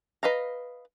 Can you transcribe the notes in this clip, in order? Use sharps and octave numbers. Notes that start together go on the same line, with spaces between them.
B4 D#5 F5 A#5